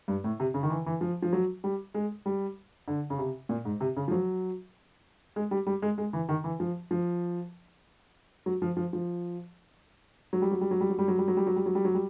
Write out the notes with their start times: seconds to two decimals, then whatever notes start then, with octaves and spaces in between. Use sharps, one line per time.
0.08 G2
0.24 A2
0.40 C3
0.54 C#3
0.63 D#3
0.70 E3
0.86 E3
1.01 F3
1.22 F3
1.33 F#3
1.64 G3
1.94 G#3
2.26 G3
2.88 D3
3.10 C#3
3.18 C3
3.49 A#2
3.65 G#2
3.81 C3
3.97 C#3
4.08 F3
4.11 F#3
5.36 G#3
5.51 G3
5.67 G3
5.82 G#3
5.98 G#3
6.13 E3
6.29 D#3
6.44 E3
6.60 F3
6.91 F3
8.46 F#3
8.62 F3
8.77 F3
8.93 F3
10.33 F#3
10.42 G3
10.51 F#3
10.61 G3
10.71 F#3
10.81 G3
10.90 F#3
10.99 G3
11.08 F#3
11.18 G3
11.28 F#3
11.37 G3
11.47 F#3
11.56 G3
11.66 F#3
11.75 G3
11.85 F#3
11.95 G3